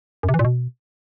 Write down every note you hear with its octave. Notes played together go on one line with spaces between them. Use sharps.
F#2
C3
E3
A#2
B2